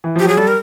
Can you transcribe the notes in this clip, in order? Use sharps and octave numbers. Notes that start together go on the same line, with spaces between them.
E3
F3 G4
F#3 G#4
G3 A4
A#4